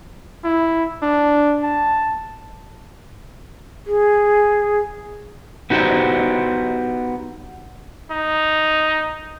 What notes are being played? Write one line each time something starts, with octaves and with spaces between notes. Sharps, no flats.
E4
D4
A5
G#4
B3 D#4 F#4 G4 C5
D#4